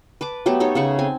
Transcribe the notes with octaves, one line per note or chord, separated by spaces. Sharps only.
B4 A5 D6
F#3 A3 B3 G4
D#4 G4 A4 C#5
C#3 A3 F#5 C#6
C4 G#5